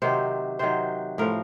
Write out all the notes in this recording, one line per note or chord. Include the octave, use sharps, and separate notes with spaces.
C3 D#3 F#3 C5
C3 D#3 F#3 C5
A2 F3 A#4